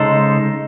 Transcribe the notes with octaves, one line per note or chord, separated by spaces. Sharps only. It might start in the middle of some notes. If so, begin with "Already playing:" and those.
Already playing: C#3 G#3 D#4 A4 C5